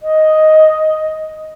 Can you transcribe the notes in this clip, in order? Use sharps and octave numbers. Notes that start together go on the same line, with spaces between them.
D#5